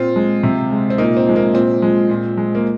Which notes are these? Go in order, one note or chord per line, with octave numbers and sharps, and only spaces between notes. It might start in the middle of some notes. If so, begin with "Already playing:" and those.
Already playing: A#2 C4 F4
G#3
C3
G#3
C4
A#2 A#3 D#4
C4
F3 G#3
A#3
A#2 C4
F3 G#3
A#2
G#3
A#3